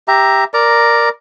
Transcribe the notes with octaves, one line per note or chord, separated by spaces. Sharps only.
G4 E5 A#5
A#4 D5 A#5